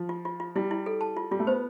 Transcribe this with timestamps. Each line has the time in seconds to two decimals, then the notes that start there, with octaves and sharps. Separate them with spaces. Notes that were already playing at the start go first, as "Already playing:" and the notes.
Already playing: F3
0.09 F4
0.25 F4
0.40 F4
0.55 G3 E4
0.71 E4
0.86 A4
1.01 A5
1.17 F4
1.31 G3 F4
1.40 A3
1.47 B3 C5